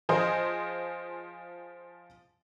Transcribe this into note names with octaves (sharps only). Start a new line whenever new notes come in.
F3 G#4 C5 D#5